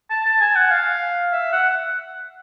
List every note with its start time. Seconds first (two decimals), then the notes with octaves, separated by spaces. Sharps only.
0.10 A5
0.26 A5
0.41 G#5
0.56 F#5
0.71 F5
1.33 E5
1.52 F#5